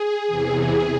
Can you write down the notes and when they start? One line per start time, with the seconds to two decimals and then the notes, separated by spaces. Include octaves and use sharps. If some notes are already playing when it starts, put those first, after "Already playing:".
Already playing: G#4
0.27 E2 C3 E3
0.58 G#4